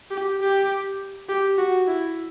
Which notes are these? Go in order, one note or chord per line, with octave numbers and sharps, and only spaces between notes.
G4
G4
G4
F#4
E4